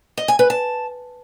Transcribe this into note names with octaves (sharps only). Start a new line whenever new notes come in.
D#5
G#5
B4
A5